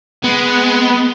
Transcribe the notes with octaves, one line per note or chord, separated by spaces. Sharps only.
G#3 B3